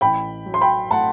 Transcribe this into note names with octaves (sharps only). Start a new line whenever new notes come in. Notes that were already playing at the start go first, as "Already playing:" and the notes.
A1 G5 B5
F#3
C6
G5 B5
A2 F#5 A5